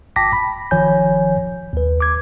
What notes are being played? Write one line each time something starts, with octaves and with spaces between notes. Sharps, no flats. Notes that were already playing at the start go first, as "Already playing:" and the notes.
G1 G5 A5 D6 A#6 B6
B5
G1 D#3 F3 C#5 G#5 G6
D#2 B4
D6 G#6